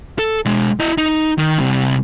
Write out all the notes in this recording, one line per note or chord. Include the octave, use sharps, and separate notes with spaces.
A4
B2 G#3
E4 D#5
D#4
D#3
C2 C3